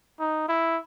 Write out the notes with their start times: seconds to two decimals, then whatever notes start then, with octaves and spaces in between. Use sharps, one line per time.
0.20 D#4
0.49 E4